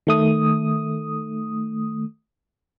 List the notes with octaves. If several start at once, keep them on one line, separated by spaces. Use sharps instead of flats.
D#3 A3 D#6